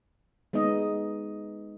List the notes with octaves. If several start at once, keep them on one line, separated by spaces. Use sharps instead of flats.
G#3 B3 D#4 D#5